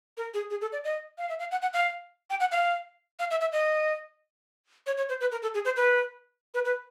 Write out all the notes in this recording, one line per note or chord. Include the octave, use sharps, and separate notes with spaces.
A#4
G#4
G#4
A4
D5
D#5
F5
E5
F5
F#5
F#5
F5
G5
F#5
F5
F5
E5
E5
D#5
C#5
C#5
C5
B4
A#4
A4
G#4
C5
B4
B4
B4